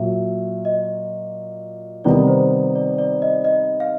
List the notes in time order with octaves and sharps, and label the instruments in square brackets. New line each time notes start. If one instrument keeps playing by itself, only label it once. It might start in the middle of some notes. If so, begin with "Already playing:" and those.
Already playing: [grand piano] A#2 F#3 [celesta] E5
[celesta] D#5
[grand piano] C3 D#3 G3 B3 D#4 [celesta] D5
[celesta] C5
D5
D5
D#5
D#5
F5